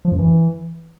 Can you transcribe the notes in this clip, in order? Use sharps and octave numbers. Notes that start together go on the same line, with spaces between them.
F3
F#2
E3